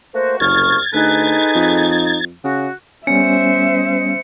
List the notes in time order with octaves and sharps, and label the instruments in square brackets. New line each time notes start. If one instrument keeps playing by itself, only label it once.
[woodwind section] A3 A#3 F#4 [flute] C5
[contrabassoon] F#1 [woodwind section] C2 F6 [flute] C#6 [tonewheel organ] G#6 A6
[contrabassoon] D2 [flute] D#4 [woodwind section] G#4 A4 B4
[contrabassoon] F2
[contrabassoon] C#3 [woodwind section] F#4
[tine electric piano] G3 B3 C#4 [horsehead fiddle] C5 E5 [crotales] C#7